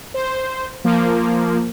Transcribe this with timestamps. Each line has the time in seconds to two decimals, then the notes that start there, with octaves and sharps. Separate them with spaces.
0.14 C5
0.84 F3 A#3